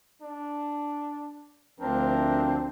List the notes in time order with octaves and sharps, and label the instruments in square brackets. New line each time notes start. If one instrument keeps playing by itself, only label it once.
[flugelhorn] D4
[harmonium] D2 F3 D4 [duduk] C4 [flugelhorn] A#4